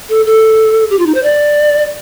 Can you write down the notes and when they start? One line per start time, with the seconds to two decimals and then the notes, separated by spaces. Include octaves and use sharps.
0.09 A4
0.26 A4
0.90 G4
0.99 F4
1.06 D#4
1.15 C5
1.23 D5